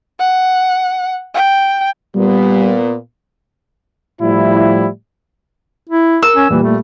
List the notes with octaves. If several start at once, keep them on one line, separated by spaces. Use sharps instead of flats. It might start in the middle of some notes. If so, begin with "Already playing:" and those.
F#5
G5
A#2 G3 B3
A2 F3 G3 E4
E4
A#4 E6
C#4
A#2 E3 G3
A3